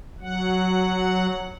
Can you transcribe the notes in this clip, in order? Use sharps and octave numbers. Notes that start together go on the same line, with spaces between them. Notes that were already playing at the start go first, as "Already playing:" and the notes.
F#3 F#5